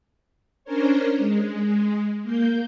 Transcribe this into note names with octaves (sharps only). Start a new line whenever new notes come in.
C#4 D4 A#4 C5 C#5
G#3
A#3 G6